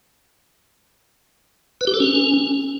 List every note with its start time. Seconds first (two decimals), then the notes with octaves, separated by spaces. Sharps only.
1.81 B4
1.87 G4
1.94 A4
2.00 C#4